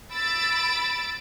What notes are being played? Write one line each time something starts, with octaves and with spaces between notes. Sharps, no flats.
B5 E6 A6 D7